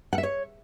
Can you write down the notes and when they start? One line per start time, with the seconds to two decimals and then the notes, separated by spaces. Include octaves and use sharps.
0.13 F#5
0.18 E5
0.23 C#5